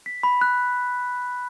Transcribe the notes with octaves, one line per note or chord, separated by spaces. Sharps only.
B6
B5
F#6